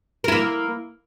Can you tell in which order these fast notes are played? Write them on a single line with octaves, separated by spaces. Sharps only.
A#4 E4 A#3